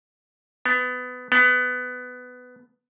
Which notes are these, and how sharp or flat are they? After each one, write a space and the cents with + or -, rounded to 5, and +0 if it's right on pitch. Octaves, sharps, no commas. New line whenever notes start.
B3 +20
B3 +15